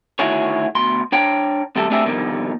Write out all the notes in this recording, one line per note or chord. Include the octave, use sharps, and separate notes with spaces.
D2 D#3 E4 F#4 G#4 C#5
D2 B2 C6
D4 C#5 G5 A#5
D#2 C3 G3 A3 A4
A3 C4 D4 G4 G#4 E5
B2 D3 D#3 F3 G3 A#3